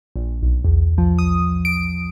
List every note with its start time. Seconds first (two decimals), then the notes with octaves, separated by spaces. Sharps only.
0.16 A#1
0.42 B1
0.65 E2
0.98 F3
1.19 D#6
1.65 D7